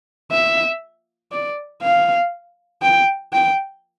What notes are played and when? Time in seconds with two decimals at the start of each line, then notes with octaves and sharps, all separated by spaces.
0.32 E5
1.32 D5
1.83 F5
2.82 G5
3.33 G5